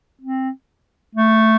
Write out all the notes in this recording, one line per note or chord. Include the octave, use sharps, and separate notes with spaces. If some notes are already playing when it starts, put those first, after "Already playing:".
C4
A3